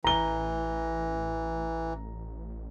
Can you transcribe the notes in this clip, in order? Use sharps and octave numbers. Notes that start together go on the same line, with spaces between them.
A1 E3 A#5 G7